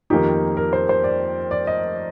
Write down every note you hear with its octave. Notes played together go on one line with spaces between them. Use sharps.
F2 D#3 A#3 D#4 G4
A#4
C5
C5
D5
D5
D#5